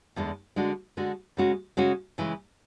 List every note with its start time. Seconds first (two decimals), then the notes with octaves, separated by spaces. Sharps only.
0.16 E2 D3 G#3
0.56 D3 G#3 D4 F#4
0.97 D3 G#3 D4 F#4
1.37 C#3 G#3 C#4 F#4
1.77 C#3 G#3 C#4 F#4
2.18 C#3 E3 G#3